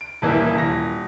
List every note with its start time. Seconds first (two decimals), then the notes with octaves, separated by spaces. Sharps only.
0.01 D7
0.22 D#1 E3 A#3 E4
0.55 D#1 A#6